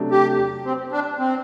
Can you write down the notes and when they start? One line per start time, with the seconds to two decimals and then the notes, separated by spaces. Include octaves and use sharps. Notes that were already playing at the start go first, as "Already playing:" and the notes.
Already playing: C3 F#3 A3 D4
0.11 G4
0.65 C4
0.92 D4
1.19 C4